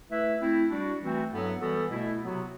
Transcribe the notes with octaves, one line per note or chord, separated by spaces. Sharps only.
A3 E4 B4 E5
A3 C4 E4
G3 D4 F#4
E3 A3 C4 F#4
G2 F#3 B3 E4 A4
E3 G3 B3 F#4 A4
B2 A3 E4
C3 F#3 B3 F#4